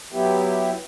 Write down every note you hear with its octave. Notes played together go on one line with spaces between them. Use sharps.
F#3 B3 E4 G4